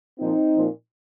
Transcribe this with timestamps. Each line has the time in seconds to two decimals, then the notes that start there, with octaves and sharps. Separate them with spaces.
0.19 A#2 F3 C4 D#4
0.54 A#2 F3